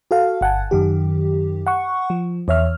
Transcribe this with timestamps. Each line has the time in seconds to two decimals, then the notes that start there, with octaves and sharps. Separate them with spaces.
0.11 F#4 A4 F5
0.41 G1 F#5 G#5 A5
0.71 F#2 D#3 G4
1.67 F#5 C#6
2.10 F3
2.48 E2 C#5 E5 F6